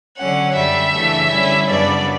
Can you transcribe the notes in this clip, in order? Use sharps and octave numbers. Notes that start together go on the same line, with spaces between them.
D3 F#3 C#4 F#5
F#2 D3 G3 E5
C#3 E3 A3 D4
D3 G3 C#4 E4
F#2 C#3 G3 B3 D4 D5